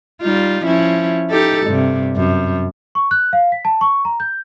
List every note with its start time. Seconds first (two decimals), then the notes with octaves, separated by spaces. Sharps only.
0.22 G3 D#4 F4
0.65 F3 C#4 E4
1.30 D#4 G4 A4
1.67 G2 C3
2.16 F#2
2.95 C#6
3.11 F#6
3.33 F5
3.52 B6
3.65 A5
3.81 C#6
4.05 A#5
4.20 G6